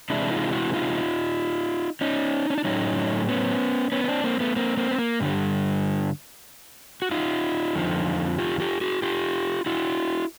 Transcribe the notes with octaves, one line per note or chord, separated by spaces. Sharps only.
C3 E3 G#3 D4 E4
D#4 F4
E4 F#4
D#4 F4
C#4 D#4
C#4
D4
A2 F#3 A3 C#4 D#4
B3 C#4
B3 C#4
C#4
C4 D4
A#3 C4
A3 B3
A#3 C4
A#3 C4
B3
A#3
G2 D3 G3
F#4
D#4 F4
F2 D3 F3
F4 G4
F4 G4
F#4 G#4
F4 G4
E4 F#4